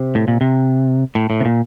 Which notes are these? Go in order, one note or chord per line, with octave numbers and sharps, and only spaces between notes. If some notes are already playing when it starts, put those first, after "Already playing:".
Already playing: C3
A2
A#2
C3
A2
A2
C3
A#2